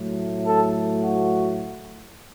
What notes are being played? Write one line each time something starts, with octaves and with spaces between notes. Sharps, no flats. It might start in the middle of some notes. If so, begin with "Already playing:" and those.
Already playing: A2 F#3 A3
A4
F#4